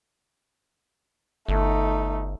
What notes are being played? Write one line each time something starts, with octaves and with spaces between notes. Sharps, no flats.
G1 A3 D#4